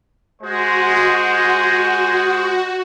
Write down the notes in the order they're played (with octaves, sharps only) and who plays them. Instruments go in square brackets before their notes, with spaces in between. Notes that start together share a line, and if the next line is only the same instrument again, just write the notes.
[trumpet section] G#3 C5 [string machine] F#4